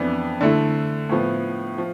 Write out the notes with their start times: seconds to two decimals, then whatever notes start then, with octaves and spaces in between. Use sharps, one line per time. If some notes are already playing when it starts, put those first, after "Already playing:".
Already playing: F2 E3 B3 D4
0.41 D3 A3 E4
1.09 A2 F3 B3
1.78 F3